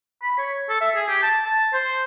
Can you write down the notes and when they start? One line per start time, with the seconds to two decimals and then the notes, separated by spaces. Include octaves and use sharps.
0.22 B5
0.38 C#5
0.69 A4
0.81 E5
0.95 G#4
1.08 G4
1.23 A5
1.44 A5
1.73 C5